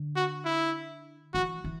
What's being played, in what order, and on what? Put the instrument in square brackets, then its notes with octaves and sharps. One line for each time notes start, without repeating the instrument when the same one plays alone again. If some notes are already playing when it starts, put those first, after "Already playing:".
Already playing: [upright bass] D3
[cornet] F#4
E4
[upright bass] E3 [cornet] F#4
[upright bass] E3